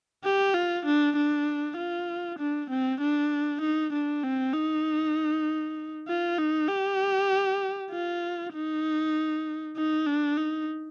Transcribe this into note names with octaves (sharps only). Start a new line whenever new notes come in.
G4
F4
D4
D4
F4
D4
C4
D4
D#4
D4
C4
D#4
F4
D#4
G4
F4
D#4
D#4
D4
D#4